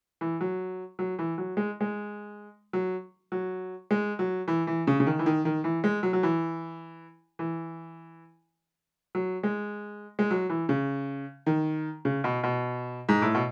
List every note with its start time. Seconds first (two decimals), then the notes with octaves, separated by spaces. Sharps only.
0.21 E3
0.41 F#3
0.99 F#3
1.19 E3
1.38 F#3
1.57 G#3
1.81 G#3
2.73 F#3
3.32 F#3
3.91 G#3
4.19 F#3
4.48 E3
4.67 E3
4.87 C#3
5.00 C#3
5.06 D#3
5.19 E3
5.26 D#3
5.45 D#3
5.64 E3
5.84 G#3
6.03 F#3
6.13 F#3
6.23 E3
7.39 E3
9.15 F#3
9.43 G#3
10.19 G#3
10.31 F#3
10.50 E3
10.69 C#3
11.46 D#3
12.05 C#3
12.24 B2
12.43 B2
13.09 G#2
13.22 A2
13.35 B2